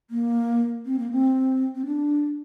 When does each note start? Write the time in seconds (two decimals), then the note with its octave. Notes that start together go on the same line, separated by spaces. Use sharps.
0.11 A#3
0.86 C4
0.99 A#3
1.12 C4
1.75 C4
1.86 D4